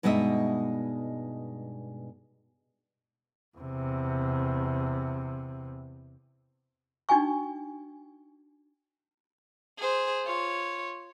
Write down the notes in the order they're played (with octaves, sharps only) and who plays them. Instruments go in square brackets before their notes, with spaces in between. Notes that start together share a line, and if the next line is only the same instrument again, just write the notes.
[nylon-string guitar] G2 B2 G#3 D#4 D#5 E5
[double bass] E2 C3
[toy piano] D4 D#4 F#4 G5 G#5 C#6
[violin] G#4 C5
F4 C#5